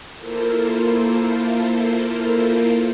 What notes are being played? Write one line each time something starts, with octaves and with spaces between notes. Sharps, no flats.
A#3 E4 F4 A4 A#4 C5